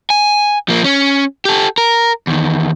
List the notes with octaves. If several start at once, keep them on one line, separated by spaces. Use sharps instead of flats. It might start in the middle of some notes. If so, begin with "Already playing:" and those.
G#5
F3 A#3
C#4
G4 A4
A#4
E2 D#3